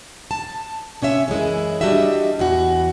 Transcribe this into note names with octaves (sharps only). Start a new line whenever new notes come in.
A5
C3 C#4 C#5 E5
F#2 E3 G#3 E4
G3 D4 F#4 D#5 E5
E2 E3 F#4